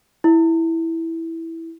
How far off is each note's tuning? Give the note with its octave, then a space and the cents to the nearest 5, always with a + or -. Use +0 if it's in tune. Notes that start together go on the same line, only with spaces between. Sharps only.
E4 -5